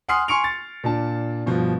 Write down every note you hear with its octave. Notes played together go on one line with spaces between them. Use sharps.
F#5 G#5 C6 D#6 F6 C7
G#5 C6 C#6 C#7 D7 F7
A6
A#2 D4 A5
G2 B2 F3